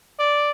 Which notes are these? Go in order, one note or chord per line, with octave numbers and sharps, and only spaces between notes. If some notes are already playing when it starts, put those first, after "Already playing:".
D5